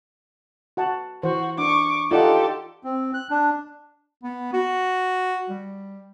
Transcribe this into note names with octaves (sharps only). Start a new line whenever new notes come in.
F#4 F#5 A5
E3 F#4 C5
D4 C#6 D6
D#4 F4 G4 A4 D5 D#5 F#5
C4
F#6
D4
B3
F#4
G3